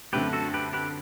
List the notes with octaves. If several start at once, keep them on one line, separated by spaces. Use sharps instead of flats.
F#2 D3 A3 C4 G4 B4
F#4 A4
G4 B4
G4 B4